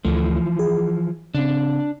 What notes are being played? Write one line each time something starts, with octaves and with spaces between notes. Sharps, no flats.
D2 E3 F3 A3
G#4
C#3 C4 D4